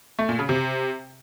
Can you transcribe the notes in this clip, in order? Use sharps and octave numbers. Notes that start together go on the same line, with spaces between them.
A3
A#2
C#3
C3